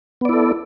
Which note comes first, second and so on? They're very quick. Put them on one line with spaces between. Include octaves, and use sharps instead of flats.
B3 D5 E4 A4